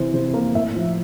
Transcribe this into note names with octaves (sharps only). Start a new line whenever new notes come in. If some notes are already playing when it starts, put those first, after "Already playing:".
Already playing: C3 E3 C5
C3 C5
A#3
A2 E5
F3